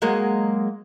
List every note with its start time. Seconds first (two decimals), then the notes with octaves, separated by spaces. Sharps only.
0.02 F#3 G#3 A#3